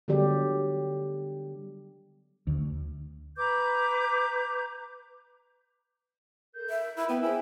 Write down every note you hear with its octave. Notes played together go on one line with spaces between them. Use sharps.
D3 F#3 G3 B3 G4 D5
D2
B4 A#5 D6 G6
A4 A#4 G6
E5
A#4
E4 B5
B3 G5
E4 G#4 C5 G5 G#5